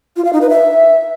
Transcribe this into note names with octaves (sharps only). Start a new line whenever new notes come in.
F4
F5
D#4
B4
E5